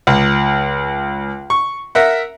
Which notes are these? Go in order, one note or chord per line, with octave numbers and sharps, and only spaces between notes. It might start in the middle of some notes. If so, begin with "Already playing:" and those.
C#2
C#6
A#4 E5 F#5